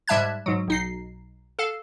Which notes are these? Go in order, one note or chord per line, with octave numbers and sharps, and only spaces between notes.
G#2 G3 E5 A5 F#6 G#6
G#2 F#3
B1 D#4 C7
A4 F5